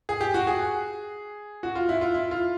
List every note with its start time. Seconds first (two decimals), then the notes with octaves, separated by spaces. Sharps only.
0.09 G#4
0.21 G4
0.34 F#4
0.47 G#4
1.63 F#4
1.75 F4
1.89 E4
2.01 F4
2.14 E4
2.31 F4